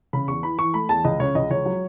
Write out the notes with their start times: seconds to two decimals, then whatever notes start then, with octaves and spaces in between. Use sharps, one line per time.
0.13 C#3 B5
0.28 E2 C#6
0.43 E3 B5
0.59 E3 C#6
0.74 A3 B5
0.89 E2 A5
1.05 C#2 D#5
1.20 C#3 C#5
1.35 C#2 D#5
1.51 C#2 C#5
1.66 F#3